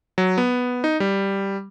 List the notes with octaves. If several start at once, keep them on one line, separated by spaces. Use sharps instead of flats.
F#3
B3
D#4
G3